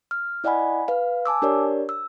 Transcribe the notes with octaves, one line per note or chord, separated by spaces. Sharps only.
F6
E4 D5 D#5 F#5 G#5 B5
B4 F5
G#5 A5 D6 E6
D4 G4 A#4 C#5 D5
E6